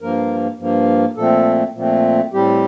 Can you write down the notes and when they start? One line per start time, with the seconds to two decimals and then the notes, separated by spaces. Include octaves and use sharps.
0.01 G2 F3 A#3 A#4
0.59 G2 F3 A#3
1.17 A#2 F3 A3 C4 A4
1.74 A#2 F3 A3 C4
2.33 A2 G3 C4 G4